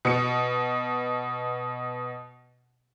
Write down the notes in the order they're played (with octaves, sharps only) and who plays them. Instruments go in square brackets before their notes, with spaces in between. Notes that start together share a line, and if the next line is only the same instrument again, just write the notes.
[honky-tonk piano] B2 C#7